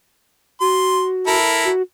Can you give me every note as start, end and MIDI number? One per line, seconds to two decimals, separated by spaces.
0.61 1.37 66
0.61 1.06 84
1.27 1.69 64
1.27 1.69 69
1.27 1.69 70
1.65 1.82 66